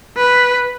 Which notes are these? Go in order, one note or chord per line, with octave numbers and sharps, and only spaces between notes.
B4